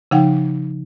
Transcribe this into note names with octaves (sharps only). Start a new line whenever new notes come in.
C#3 F3 D#4 F#5 G5